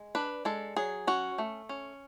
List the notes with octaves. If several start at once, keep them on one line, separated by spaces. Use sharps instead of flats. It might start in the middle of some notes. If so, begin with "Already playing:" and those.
Already playing: G#3
D4 B4
G#3 A4
F#3 G#4
C#4 F#4
A3
C#4